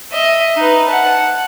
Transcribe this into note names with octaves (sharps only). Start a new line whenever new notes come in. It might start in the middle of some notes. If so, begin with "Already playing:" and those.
D#5 E5
D#4 B4
F#5 A5